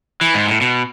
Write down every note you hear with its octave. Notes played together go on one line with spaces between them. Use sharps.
E3
G#2
A2
B2